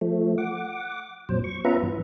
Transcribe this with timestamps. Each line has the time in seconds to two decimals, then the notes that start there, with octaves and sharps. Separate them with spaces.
0.01 F3 A3
0.38 F#5 D6
1.29 F2 A#2 F#3 C5
1.44 C#6
1.65 B3 C#4 F4 B4 E5 A#5
1.83 G2 E3